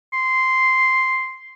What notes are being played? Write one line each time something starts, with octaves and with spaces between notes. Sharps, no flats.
C6